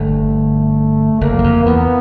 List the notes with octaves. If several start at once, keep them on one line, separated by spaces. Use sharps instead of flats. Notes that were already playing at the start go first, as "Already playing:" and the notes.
Already playing: G1 G2 A3
F#1 F#2 A#3
E2
F2
E2 B3